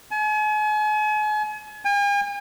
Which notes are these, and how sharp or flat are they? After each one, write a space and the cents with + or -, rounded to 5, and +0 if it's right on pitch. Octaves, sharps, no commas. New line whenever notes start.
G#5 +40
G#5 -45